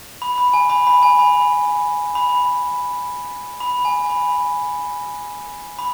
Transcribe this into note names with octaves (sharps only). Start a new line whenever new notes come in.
B5
B5
G#5
B5
B5
G#5
B5
B5
B5
G#5
B5
B5